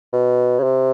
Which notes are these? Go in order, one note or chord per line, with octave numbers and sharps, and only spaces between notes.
B2
C#3
C3